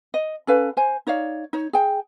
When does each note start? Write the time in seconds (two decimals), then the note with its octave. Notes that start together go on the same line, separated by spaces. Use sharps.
0.14 D#5
0.47 C#4 A4 B4 F5
0.77 C5 G#5
1.07 D#4 C#5 D5 F5
1.53 D#4 C#5
1.73 G#4 G5